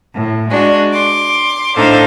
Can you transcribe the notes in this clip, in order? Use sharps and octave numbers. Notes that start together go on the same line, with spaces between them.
A2
G#3 D4 F#4
C6 D6
A2 D4 D#4 A4 C5 F5